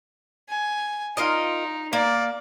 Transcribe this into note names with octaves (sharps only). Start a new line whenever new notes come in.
G#5
D#4 F4 A#4 D#5
A#3 D5